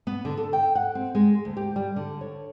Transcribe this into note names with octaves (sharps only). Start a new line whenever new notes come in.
B3
D3
A4
G5
F#5
C4
G#3
D2
G4
G3
D3
C#5